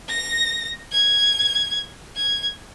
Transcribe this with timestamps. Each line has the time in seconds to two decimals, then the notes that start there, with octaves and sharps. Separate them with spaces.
0.09 A#6
0.92 G#6
2.15 G#6